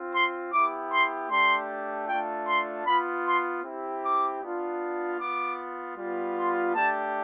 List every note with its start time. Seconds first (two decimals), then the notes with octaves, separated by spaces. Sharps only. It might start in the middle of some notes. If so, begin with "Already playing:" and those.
Already playing: C4 F4
0.14 C6
0.53 B3 E4 G4 D6
0.92 C6
1.30 A3 D4 G4 C6
2.09 A3 D4 F4 G5
2.47 C6
2.86 B3 F4 B5
3.25 C6
3.64 C4 E4 G4
4.03 D6
4.42 B3 D4 F4
5.19 B3 F4 D6
5.97 G3 B3 F4
6.37 C6
6.75 A3 D4 G4 A5